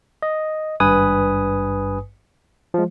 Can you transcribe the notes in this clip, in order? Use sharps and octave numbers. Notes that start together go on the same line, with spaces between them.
D#5
G#1 G2 B4 G#5 D#6
F3 G#3